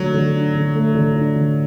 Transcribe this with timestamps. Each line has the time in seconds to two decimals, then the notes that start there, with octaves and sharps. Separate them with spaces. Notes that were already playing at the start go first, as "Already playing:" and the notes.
Already playing: D3 F#3 A3
0.14 D3
0.35 D4
0.55 D3
0.75 A3
0.95 D3
1.15 D4
1.36 D3